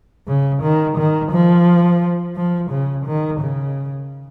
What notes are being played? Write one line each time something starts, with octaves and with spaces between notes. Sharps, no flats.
C#3
D#3
D#3
F3
F3
C#3
D#3
C#3